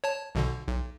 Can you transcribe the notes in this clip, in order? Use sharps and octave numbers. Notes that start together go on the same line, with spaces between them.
C#5 A5
B1 B2 D3
B1